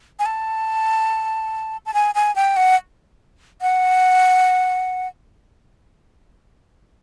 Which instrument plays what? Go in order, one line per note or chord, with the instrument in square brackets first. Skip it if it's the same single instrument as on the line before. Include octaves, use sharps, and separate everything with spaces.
[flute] G#5
A5
A5
G#5
G#5
G5
F#5
F#5